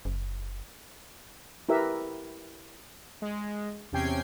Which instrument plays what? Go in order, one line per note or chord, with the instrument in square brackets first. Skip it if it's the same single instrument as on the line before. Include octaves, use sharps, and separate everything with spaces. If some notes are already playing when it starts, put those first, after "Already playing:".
[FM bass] F#1
[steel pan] E4 G4 A#4 B4 E5
[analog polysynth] G#3
E2 C3 C#4 G5 G#6 C7